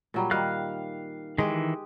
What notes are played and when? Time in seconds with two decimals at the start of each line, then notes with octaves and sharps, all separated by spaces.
0.14 A#2 F#3 G3
0.31 D#3 G3 F5 F6 F#6
1.38 D#3 E3 G#3 G4